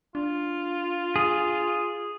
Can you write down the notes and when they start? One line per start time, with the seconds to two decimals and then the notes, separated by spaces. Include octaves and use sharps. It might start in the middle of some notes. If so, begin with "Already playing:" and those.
0.15 D4 F4
1.16 G#4